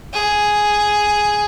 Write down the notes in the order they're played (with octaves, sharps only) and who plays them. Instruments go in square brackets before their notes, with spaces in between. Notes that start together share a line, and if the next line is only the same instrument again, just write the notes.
[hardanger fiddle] G#4